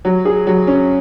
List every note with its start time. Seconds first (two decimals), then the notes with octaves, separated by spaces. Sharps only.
0.05 F#3
0.25 G#4
0.47 F#3
0.67 C#4